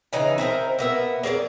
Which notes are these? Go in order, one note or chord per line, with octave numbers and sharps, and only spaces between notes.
C#3 E3 D#4
C4 E4 G#4 A#4
A#3 B3 E5
A#3 G#4 C#5 D5